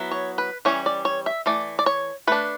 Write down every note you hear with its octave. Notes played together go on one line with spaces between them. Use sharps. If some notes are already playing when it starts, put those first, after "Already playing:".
Already playing: F#3 B3 E4
C#5
B4
E3 G3 C#4 C#5
D5
C#5
E5
E3 A3 D5
D5
C#5
A3 D4 B4